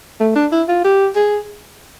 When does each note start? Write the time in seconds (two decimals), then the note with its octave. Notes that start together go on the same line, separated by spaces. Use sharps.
0.20 A3
0.36 D4
0.52 E4
0.68 F4
0.84 G4
1.16 G#4